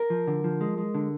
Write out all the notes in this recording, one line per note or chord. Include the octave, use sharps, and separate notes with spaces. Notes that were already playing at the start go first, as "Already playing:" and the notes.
Already playing: A#4
F3
D3
F3
G#3
G#3
D3